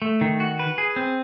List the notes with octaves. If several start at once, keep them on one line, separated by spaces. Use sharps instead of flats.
A3
D#3
F#4
B4
G#4
C4